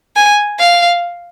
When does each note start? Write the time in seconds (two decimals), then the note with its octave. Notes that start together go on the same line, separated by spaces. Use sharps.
0.16 G#5
0.60 F5